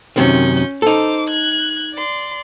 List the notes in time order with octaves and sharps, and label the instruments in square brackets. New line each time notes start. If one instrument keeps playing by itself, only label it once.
[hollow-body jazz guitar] F#2 C3 D#3 [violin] C#4 G6
[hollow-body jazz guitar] D#4 A4 [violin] C5 D6
[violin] F#6 G#6
D5 C6